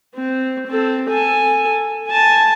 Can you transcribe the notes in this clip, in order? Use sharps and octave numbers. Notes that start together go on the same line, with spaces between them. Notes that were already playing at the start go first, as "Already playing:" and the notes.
C4
C4 A4
A4 G#5
G#5 A5